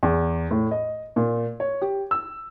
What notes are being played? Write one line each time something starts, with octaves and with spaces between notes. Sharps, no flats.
E2
A2
D#5
A#2
C#5
G4
E6